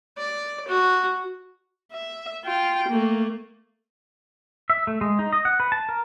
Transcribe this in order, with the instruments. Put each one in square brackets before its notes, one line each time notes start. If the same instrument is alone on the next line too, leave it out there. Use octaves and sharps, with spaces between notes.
[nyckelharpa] D5
F#4
[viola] E5
F4 G5
A3 A#3
[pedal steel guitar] E5
A3
G#3
D#4
D#5
F#5
B4
A5
A#4